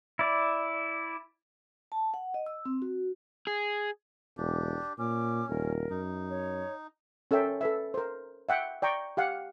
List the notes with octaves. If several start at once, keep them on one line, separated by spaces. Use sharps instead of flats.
E4 D5
A5
F#5
D#5
E6
C4
F#4
G#4
E1 D4 G4
A#2 C#4 D6
D#1 A#4
F#2 D#4
C#5
C#4 A4 A#4 E5 G5
A4 B4 E5
A#4 C5
E5 F#5 G5
D5 G5 A#5 C#6
G4 F5 F#5